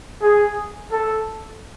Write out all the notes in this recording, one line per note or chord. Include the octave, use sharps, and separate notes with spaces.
G#4
A4